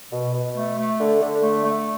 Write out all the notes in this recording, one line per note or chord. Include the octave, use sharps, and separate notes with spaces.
B2
B2
A3
A3
D3
D3
A3
A3